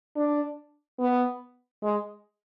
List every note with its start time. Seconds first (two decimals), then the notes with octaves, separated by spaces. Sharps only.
0.16 D4
1.00 B3
1.83 G#3